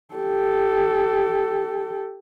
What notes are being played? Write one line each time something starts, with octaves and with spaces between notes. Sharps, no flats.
G4 A4